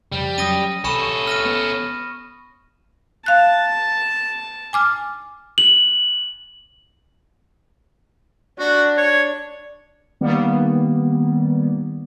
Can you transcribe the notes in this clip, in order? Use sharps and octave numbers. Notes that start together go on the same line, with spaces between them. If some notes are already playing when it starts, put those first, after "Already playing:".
F2 C#3 G3
F#3 C#4 D#6 A#6 D#7
C2 C#4 A4 B5 C#6 E7
F6 A#6 D#7
B3
F5 A5 F#6
G#5 D6 F6
F#7
D4 F#4
C#5
D#3 G3 A#3 B3